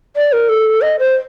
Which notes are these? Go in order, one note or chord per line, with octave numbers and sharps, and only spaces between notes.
D5
A#4
A4
D#5
C5